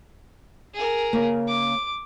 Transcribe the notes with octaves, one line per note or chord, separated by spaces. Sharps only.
G#4 A#4
C#3 A#3
D6